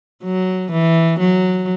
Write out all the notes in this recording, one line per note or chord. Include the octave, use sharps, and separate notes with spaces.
F#3
E3
F#3